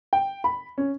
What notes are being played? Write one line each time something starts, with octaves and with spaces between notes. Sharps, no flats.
G5
B5
C#4